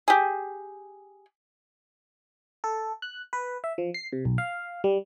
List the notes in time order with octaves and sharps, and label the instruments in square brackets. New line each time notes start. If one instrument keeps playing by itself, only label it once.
[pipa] G4 G#4
[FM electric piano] A4
F#6
B4
E5
F3
C7
C3
B1
F5
G3